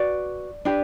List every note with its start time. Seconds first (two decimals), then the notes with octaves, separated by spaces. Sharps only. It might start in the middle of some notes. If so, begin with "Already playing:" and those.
Already playing: F#4 B4 D5
0.65 D4 G4 B4